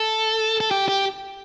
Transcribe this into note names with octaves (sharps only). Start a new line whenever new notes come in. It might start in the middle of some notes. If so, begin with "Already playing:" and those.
Already playing: A4
A4
G4
G4